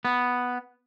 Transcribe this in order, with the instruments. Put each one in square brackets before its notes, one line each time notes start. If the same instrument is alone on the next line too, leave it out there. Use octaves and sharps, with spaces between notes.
[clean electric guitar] B3